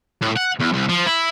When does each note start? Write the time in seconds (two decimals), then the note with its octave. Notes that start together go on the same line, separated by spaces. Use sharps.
0.22 A2
0.37 F#5
0.60 E2
0.73 C2
0.89 F3
1.07 E4